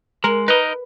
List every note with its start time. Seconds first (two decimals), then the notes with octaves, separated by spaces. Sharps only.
0.24 G#3 A#4
0.48 D#4 A#4 B4 D#5